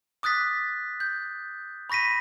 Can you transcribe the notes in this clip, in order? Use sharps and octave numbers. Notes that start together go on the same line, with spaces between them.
D6 D#6 F#6 A6 B6
G6
B5 C#6 A#6 B6 D#7